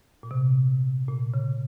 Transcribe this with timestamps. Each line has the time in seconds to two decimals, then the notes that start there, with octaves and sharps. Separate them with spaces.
0.23 A#2
0.31 C3
1.08 A#2
1.34 C#3